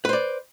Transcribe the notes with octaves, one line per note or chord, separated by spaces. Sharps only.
B4 C5 D5